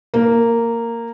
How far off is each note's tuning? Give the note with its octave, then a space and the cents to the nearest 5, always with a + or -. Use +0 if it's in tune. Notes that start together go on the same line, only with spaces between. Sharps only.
A#3 -10